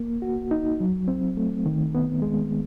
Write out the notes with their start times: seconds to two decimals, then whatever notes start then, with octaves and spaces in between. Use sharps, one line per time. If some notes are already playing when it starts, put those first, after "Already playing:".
Already playing: A#3
0.22 F#4
0.51 D#4
0.80 F#3
1.08 C4
1.37 A3
1.66 D#3
1.95 B3
2.22 G#3